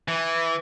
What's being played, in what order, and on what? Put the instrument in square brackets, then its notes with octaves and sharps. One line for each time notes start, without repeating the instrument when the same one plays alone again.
[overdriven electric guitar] E3